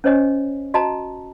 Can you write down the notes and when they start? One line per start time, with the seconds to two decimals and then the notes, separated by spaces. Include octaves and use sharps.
0.04 C#4 C5 C#5 D#5 G#5
0.74 F#4 D#5 A5 A#5